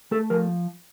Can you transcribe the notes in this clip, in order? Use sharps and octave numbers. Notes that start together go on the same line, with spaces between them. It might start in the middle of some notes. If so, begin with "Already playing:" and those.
A3 A4
F3 A#4